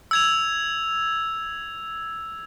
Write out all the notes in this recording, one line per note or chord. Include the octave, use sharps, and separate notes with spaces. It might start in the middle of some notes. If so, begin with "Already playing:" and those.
E6 G#6 F7